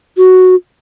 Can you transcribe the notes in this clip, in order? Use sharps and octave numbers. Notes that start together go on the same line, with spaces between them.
F#4